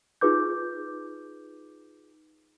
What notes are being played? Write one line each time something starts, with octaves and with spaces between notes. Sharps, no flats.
D#4 F4 G#4 B4 D6 G6